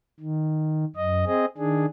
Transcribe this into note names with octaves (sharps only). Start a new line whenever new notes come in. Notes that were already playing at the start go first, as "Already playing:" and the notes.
D#3
F#2 D#5
C4 G#4 D#5
D#3 D4 G#4